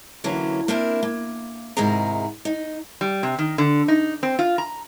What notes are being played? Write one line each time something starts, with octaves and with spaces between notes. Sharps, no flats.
D3 E3 F#3 A#3 C#4
A#3 C4 D4 E4 A#4
A#3
G#2 C3 D#3 E4 G#4 A#5
D#4
G3
C3
D#3
D3
D#4
C4
F4
A#5